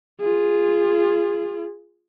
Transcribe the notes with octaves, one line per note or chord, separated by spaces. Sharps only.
F4 G#4